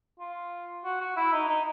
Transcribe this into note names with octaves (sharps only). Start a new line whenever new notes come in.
F4
F#4
F#4
E4
D#4
D#4